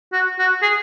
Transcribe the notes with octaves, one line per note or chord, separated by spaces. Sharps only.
F#4
F#4
G#4